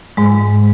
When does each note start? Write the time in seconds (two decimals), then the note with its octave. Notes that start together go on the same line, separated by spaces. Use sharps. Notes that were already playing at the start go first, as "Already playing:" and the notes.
0.17 G#2 G#3